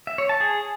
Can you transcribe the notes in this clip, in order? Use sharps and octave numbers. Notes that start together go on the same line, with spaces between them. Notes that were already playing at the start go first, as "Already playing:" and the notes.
E5
C#5
A5
G#4